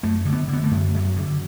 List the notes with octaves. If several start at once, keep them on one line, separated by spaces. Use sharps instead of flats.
F#2 A3
D3
B3
D3
B3
A3
F#2
F#2 F#3
D3